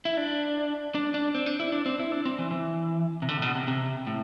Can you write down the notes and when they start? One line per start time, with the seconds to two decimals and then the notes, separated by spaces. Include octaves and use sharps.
0.05 E4
0.17 D4
0.95 D4
1.14 D4
1.34 C4
1.46 D4
1.60 E4
1.72 D4
1.86 C4
1.99 E4
2.12 D4
2.25 C4
2.38 E3
2.51 E3
3.22 C3
3.29 D3
3.37 A2
3.42 B2
3.55 C3
3.68 C3
4.07 A2